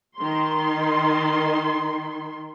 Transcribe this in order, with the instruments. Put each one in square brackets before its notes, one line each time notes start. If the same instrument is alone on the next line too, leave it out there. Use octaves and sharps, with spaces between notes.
[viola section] D#3 C6